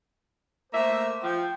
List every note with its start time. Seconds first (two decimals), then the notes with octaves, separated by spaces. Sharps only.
0.72 A3 A#3 C5 E5
1.23 F3 G5